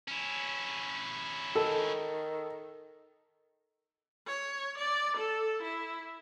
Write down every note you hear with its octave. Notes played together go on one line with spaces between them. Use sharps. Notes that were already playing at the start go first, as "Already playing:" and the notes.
C#4 E4
D#3 A4
C#5
D5
A4
E4